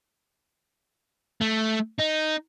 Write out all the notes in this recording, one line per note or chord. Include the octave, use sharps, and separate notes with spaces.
A3
D#4